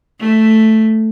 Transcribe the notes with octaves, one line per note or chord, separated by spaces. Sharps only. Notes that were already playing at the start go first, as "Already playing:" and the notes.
A3